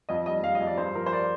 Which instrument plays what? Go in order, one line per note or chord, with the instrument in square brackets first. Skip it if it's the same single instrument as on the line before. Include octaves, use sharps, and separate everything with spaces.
[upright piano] F2 D#5
G3 D#5
F2 F5
D#5
F2
D5
G2 C5
F3 A#4
C5
D5